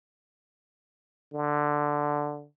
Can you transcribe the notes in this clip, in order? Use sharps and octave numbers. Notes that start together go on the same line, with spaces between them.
D3